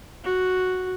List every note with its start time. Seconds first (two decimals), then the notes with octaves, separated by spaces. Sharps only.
0.24 F#4